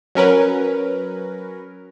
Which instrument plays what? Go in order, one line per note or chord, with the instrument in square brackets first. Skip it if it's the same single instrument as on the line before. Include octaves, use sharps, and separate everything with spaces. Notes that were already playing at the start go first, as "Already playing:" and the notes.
[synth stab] F#3 C#4 A#4 B4